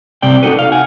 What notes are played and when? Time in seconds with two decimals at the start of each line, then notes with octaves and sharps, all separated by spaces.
0.22 C3 G3 C4 D5 G5
0.43 B3 D#4 F#4 A4 B4
0.59 F5
0.72 F#5 G#5